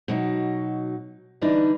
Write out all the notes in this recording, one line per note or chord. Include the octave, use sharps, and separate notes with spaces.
B2 F#3 D#4
D3 E3 G3 D4 D#4 B4